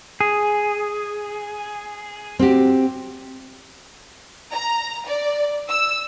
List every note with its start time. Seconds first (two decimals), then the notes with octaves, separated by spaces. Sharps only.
0.21 G#4
2.39 C4 F#4 G4
4.52 A#5
5.07 D5
5.69 E6